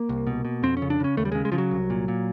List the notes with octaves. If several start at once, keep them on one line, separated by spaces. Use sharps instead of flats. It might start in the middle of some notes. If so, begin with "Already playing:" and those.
Already playing: A#3
C2
B2
B2
F2 C4
C#4
C#3
D4
C#3 C#4
D#2 A3
G3
C#3 G#3
G#3
C#3 F3
F#3
C2
A#2
A#2